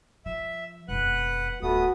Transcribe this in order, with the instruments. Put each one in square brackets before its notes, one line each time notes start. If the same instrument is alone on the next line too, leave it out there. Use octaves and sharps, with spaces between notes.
[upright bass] F3 [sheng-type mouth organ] E5
[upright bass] E1 F2 [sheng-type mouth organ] B4 F#5 F#6
[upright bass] D1 [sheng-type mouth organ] A3 B3 D#6 [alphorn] F#4